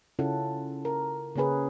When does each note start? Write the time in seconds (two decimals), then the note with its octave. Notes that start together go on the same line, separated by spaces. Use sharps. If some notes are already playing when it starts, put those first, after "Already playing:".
0.19 C#3 C#4 E4 F4 A4 F#5
0.85 A#4
1.36 C#3 A#3 C#4 G#4 B4